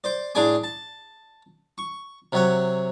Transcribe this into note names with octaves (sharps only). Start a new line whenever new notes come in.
C5 D5
A2 D4 G#4 D5 G#5 D6
A5
C#6
C3 F#3 C#5 F#5